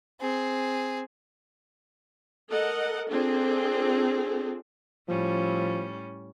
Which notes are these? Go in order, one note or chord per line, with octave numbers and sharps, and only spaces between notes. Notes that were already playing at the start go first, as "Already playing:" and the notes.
C4 G#4
A4 A#4 D#5 F#5
C4 D4 F4 G#4 A4
A2 F3 G3 C#4